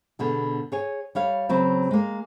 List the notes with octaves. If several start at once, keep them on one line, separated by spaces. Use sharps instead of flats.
B2 D3 G#4
G#4 C#5 G#5
G3 C#5 F5
C#3 F#3 C4 B4
G#3 A#3